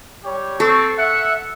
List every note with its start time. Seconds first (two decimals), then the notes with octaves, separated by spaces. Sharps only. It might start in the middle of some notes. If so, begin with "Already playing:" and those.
0.25 G3 G4 C#5
0.60 C4 A4 C#6
0.99 E5 F#5